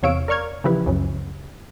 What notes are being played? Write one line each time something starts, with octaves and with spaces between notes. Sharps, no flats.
E2 C3 C#5 F5 E6 D7
A#4 D5 C#6 F6 G#6
C#3 E3 F3 E4 G4 B4
C#2 F#2 C#3